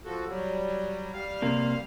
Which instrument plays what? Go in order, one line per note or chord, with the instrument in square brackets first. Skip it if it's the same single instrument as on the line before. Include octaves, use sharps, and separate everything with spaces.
[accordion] F3 F#4 A4
F#3 G3
G3 F5
[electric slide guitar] C3 A#3